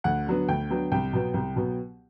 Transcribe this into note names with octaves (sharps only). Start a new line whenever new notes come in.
D2 F#5
D3 F#3 B3
D2 G5
D3 F#3 B3
C2 G5
B2 F#3 B3
C2
B2 F#3 B3